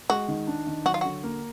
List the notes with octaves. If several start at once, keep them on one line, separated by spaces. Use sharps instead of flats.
G#3 F#4
D#3
D4
D#3
F#3 F#4
F4
D3 F#4
A#3